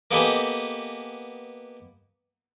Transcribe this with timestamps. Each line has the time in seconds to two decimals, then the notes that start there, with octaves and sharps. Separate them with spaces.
0.11 A#3 B3 G4 A4 D#5 G#5